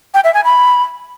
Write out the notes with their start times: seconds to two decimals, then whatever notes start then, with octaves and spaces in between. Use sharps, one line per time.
0.14 G5
0.24 E5
0.34 G#5
0.44 B5